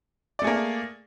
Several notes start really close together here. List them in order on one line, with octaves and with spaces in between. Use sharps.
D5 A3 G#4 A#3